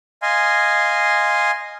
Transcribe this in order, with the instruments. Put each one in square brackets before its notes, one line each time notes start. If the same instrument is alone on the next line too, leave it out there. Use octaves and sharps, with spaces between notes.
[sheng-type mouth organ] D#5 F5 G#5 C6